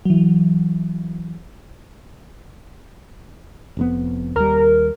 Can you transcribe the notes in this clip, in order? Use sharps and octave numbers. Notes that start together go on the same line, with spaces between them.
E3 F#3
F1 F2 B3
D#2 G3 A#4